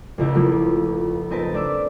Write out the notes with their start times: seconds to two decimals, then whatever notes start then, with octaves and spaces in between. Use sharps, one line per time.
0.18 F1 C#2 E4
0.34 F3 A3 A#3
1.30 C4 D#4 A#4 B4 A5
1.53 A3 D4 D5 D6 E6